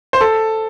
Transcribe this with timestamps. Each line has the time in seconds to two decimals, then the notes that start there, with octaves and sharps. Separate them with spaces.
0.13 C5
0.21 A4